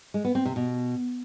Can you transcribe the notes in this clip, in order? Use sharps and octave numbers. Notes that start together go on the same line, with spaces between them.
G#3
B3
C4
C3
B2